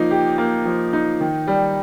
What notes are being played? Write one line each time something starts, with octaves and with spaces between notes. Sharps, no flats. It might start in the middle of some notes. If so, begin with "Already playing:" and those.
Already playing: F3 A#3 D#4
G4
A#3
F3
D#4
D#3
G3